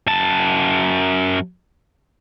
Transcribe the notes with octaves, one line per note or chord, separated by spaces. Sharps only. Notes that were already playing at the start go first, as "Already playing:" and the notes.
F#2 A5